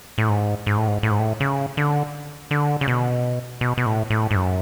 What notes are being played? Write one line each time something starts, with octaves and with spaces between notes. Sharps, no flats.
A2
G#2
G#2
A2
G#2
A2
G#2
A2
C#3
D3
D3
C#3
B2
B2
B2
A2
A2
G#2
F#2